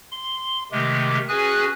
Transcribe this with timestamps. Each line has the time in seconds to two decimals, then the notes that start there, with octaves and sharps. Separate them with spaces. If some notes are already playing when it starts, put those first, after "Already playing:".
0.11 C6
0.72 C3 D#3 G#3 A3 G4
1.28 C#4 F#4 G#4 B4 G#5 F#6